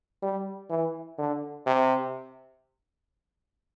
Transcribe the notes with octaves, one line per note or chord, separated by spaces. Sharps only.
G3
E3
D3
C3